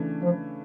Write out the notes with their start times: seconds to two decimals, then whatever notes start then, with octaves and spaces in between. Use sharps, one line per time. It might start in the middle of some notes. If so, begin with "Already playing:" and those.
Already playing: C#3 E3 A3 D4
0.22 F3